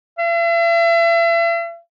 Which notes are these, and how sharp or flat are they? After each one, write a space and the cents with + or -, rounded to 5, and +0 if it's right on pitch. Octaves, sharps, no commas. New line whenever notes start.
E5 +40